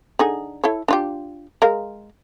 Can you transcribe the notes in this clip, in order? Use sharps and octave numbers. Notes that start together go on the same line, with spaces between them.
D3 D#4 G#4
E4 A4 C#5
D4 F4 G4
G#3 A#4 F5